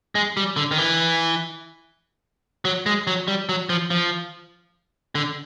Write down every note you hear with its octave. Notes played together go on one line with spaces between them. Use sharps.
G#3
G3
D3
D#3
E3
F#3
G#3
F#3
G3
F#3
F3
F3
D3